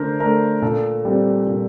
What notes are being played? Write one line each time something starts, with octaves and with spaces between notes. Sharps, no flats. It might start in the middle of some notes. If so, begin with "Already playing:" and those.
Already playing: D3 A3 D4 A#4 C5
A3 D4 A#4
A#2 A4
G3 C4
A#2